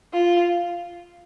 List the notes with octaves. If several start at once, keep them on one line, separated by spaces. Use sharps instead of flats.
F4